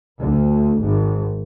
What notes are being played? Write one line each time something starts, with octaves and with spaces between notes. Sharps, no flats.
D2
G#1